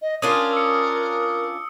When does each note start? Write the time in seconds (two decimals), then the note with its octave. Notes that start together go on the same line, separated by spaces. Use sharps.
0.01 D#5
0.22 C#4 D4 F4 A#4 D#6
0.53 E6 C#7